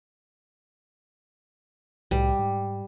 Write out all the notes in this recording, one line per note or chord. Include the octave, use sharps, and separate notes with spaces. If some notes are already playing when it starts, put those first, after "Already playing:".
C2 A2 G3
G#2